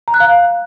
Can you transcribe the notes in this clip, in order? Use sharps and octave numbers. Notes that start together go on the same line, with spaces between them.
A#5
F#6
F5